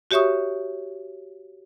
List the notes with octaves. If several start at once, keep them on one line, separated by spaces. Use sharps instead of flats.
F#4 G4 C#5 E5 C#6 D#6